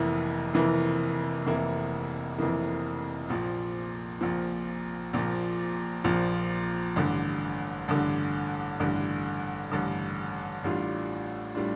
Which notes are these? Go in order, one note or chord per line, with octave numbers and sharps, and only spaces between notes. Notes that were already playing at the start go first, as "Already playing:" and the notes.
Already playing: F1 F2 E3 A#3 E4
F1 F2 E3 A#3 E4
F1 F2 E3 A#3 E4
F1 F2 E3 A#3 E4
A#1 A#2 F3
A#1 A#2 F3
A#1 A#2 F3
A#1 A#2 F3
A1 G2 D3
A1 G2 D3
A1 G2 D3
A1 G2 D3
A1 A2 G3 D4 F4
A2 G3 D4 F4